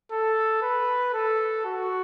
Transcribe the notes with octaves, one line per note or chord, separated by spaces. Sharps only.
A4
B4
A4
F#4